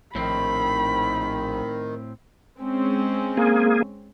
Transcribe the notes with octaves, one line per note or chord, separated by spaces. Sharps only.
A#1 A2 D#3 C4 B5
G#3 C4 C#4
A#3 G#4